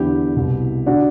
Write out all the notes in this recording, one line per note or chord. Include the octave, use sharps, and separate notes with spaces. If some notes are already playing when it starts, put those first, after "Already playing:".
Already playing: E2 D3 E4 G4
C2 B2
D3 D4 F#4